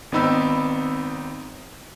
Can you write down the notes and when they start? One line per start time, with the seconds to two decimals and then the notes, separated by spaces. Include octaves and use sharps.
0.12 G#1 B3 C4 D#4 B5 E6